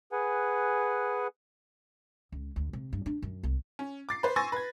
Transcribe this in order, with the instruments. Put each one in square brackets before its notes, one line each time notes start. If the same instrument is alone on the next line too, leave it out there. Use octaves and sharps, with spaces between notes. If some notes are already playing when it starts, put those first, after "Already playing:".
[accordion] G#4 B4 F#5 G#5
[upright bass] C#2
D2
C3
G2
D4
F#2
C2
[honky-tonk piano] C#4
D6 A6 C7
B4 C5
G#5 C6 C#6 E6 A6 A#6
B4 G#6